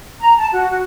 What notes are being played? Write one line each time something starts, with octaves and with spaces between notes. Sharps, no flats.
A#5
A5
F#4
F#4